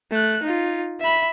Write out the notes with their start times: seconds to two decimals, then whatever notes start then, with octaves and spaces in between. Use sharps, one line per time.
0.11 A3 F#6
0.43 D#4 F4
1.00 E5 B5